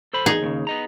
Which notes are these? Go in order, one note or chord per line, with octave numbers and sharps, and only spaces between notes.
A4 C5 B5
E2 D#4 G#4
D#2 A2 C#3
B3 D#5 A#5